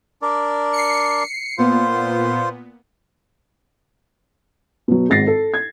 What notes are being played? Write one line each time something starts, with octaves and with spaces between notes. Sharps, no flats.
D4 A#4 D5
C7 C#7
A#2 B3 F4 C5
B2 F#3
G#1 G#2 A6 A#6 C7
A4
G#6